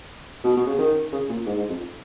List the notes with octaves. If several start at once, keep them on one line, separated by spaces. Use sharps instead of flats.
B2
B2
C#3
D#3
C#3
A#2
G#2
G#2
F2